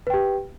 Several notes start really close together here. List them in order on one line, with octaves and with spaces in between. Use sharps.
B4 G5 G4